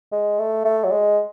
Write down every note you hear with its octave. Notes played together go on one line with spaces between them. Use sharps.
G#3
A3
A3
F#3
G#3